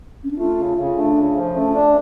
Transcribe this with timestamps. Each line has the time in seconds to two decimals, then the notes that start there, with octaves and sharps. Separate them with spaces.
0.24 C#4
0.31 D4
0.39 A3 F4
0.58 C#3
0.77 C#3
0.96 A3 D4
1.17 C#3
1.36 F3
1.56 A3 C#4
1.75 D4